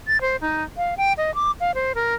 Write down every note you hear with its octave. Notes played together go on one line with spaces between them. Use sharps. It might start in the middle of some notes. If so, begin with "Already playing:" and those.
A6
C5
D#4
F5
G5
D#5
D6
F5
C5
A#4